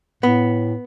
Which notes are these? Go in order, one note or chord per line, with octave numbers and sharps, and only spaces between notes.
A2 B3